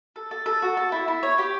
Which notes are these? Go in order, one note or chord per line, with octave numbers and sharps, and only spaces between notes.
A4
A4
A4
F#4
A4
E4
E4
C#5
G4